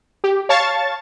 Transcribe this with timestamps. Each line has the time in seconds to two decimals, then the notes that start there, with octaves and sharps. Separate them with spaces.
0.24 G4
0.49 C#5 F5 A5 C#6 A6